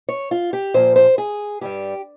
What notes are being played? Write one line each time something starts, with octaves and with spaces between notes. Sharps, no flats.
C#5
F4
G4
A#2 F3 C5
C5
G#4
G2 G3 G4